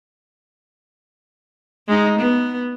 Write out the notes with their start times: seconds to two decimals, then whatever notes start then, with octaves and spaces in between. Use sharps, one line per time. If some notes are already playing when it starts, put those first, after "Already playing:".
1.88 G#3 D#4
2.19 B3